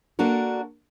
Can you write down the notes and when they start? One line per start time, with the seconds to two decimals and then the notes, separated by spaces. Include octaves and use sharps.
0.19 A#3 D4 F#4 A4 A#4